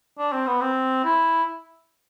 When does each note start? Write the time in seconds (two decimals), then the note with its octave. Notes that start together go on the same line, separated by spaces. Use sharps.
0.18 D4
0.32 C4
0.47 B3
0.61 C4
1.04 E4